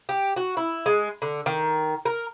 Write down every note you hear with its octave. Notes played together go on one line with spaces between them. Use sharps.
G4
F#4
E4
G#3
D3
D#3
A#4